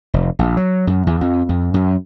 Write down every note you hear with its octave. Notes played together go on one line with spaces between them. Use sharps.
F1
A#1
F#3
F#2
E2
F2
F2
F#2